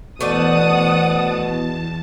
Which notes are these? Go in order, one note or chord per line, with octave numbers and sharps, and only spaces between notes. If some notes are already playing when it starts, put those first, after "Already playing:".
E2 B2 A3 C5 D5 F#5 A5 D#6